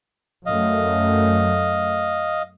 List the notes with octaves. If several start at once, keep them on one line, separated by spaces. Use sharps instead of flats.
F#2 A3 D#5 F5